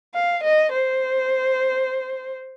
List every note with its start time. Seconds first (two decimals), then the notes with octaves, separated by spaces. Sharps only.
0.15 F5
0.44 D#5
0.72 C5